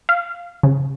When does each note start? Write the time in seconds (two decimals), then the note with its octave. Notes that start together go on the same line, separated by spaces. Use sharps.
0.09 F5
0.63 C#3